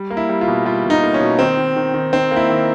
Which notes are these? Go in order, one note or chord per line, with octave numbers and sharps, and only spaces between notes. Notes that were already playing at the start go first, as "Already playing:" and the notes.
Already playing: G3
A#3
E4
G3
F4
B2
G3 F4
B2
D#4
A#3
C#4
B2
D#3 C4
D#3
D#3
D#3
D#3 C4
A#3
E4
D#3